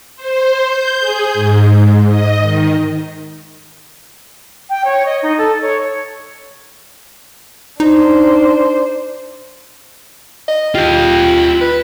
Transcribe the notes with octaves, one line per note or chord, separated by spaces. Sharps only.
C5
G6
G#4
G#2
D#5
D#3
G5
C#5
D#5
D#4
A4
C#5
D4 D#4 C5
D#5
F4 G4 D#5
B4